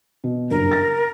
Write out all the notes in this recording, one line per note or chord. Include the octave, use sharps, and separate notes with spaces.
B2
F#1 G2 A#4
A6 A#6